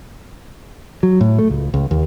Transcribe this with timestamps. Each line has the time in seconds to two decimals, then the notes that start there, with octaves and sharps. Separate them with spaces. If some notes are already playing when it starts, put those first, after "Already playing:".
1.03 F#3
1.21 A2
1.39 A3
1.50 C#2
1.74 C#2
1.91 D#2